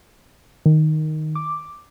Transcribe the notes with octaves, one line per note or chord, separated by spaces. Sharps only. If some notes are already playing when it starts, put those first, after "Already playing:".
D#3
D6